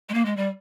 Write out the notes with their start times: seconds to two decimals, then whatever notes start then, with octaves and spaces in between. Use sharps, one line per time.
0.09 G#3
0.14 A#3
0.25 G#3
0.37 G3